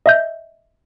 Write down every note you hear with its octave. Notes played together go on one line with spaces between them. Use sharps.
D#5 E5 G6